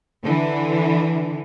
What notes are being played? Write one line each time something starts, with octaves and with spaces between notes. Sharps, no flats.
D3 E3